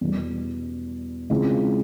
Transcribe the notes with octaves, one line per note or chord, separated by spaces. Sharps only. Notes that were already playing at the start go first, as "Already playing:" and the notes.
E2 B2 G3
C#3 F3 G#3 C4 E4